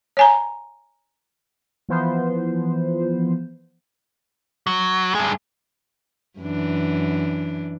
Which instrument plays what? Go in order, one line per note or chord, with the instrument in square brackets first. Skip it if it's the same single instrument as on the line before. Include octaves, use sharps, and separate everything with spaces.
[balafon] C#5 G#5 A#5
[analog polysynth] E3 F3 B3 C5
[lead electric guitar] F#3
G2 G#3
[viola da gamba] F#2 E3 D4